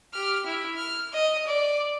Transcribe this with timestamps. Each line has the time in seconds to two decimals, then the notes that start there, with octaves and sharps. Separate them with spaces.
0.13 G4 F6
0.46 E4
0.76 F6
1.13 D#5
1.47 D5